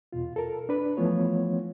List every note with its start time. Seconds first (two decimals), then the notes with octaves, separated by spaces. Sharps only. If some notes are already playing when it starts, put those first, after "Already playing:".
0.12 E2 B2 F4
0.36 A4 A#4
0.69 D4 B4
0.97 E3 F3 A3 B3 F4 C#5